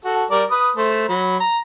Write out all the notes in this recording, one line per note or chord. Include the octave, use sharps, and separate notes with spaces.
F#4 A4
G3 A#4 D5
B4 D#6
A3 C5
F#3 B5
A#5